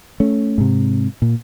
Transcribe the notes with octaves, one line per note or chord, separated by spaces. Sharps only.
A3 C#4
G#2 C3
A#2